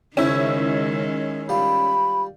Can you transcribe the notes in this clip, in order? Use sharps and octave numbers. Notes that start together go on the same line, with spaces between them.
C#2 D#3 G#3 C#4 E4 C5
G3 F4 B5